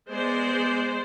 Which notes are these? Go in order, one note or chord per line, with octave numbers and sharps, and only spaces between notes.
G#3 B3 C5 D5